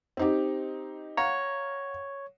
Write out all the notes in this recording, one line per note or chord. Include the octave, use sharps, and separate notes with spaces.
C4 D#4 G4
C#5 F5 F#5 A#5